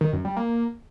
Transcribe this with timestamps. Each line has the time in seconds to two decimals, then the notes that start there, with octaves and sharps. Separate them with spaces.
0.01 D#3
0.13 F#2
0.25 G3
0.37 A#3